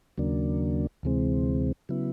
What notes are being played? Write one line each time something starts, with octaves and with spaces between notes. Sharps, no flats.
D#2 C#3 F#3 A#3 D4
D2 C3 E3 G#3 C4
C#3 F#3 B3 E4